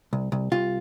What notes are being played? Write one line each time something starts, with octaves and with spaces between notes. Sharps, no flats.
C2
C2
C2 F4